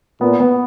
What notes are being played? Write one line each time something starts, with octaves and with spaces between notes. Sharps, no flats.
A#2 B3
B3